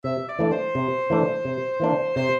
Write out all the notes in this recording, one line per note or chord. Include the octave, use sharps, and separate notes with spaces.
C3 E5
D5
E3 A3 D4
C5
C3
E3 A3 D4
C3
E3 A#3 D4
C3 C5